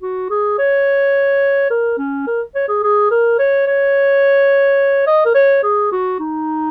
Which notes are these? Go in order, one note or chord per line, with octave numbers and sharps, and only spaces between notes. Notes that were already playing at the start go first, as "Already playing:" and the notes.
F#4
G#4
C#5
A#4
C#4
A#4
C#5
G#4
G#4
A#4
C#5
C#5
D#5
A#4
C#5
G#4
F#4
D#4